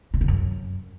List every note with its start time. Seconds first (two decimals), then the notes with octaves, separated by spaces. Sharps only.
0.14 B2
0.21 C#3
0.28 F#2